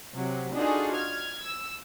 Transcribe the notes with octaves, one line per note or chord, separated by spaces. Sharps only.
C3 F#3
D4 D#4 F4 F#4 G#4 A4
F6 G#6
E6